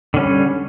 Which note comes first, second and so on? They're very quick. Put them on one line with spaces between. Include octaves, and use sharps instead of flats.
D3 C#4 G3